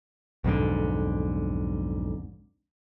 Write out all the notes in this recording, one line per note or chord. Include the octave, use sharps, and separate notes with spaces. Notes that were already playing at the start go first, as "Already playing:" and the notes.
B1 F2 G#2 D3